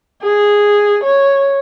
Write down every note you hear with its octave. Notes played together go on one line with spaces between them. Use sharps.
G#4
C#5